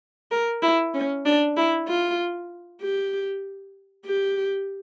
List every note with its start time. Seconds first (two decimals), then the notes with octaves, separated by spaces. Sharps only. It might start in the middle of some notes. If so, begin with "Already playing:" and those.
0.31 A#4
0.62 E4
0.94 C#4
1.26 D4
1.57 E4
1.88 F4
2.82 G4
4.06 G4